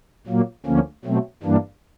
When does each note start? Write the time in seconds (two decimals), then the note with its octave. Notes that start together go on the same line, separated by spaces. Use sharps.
0.27 A#2 F#3 A#3
0.66 D2 D3 F3 A#3 C#4
1.05 B2 F#3 A3 C4
1.43 G2 E3 G3 A#3 D4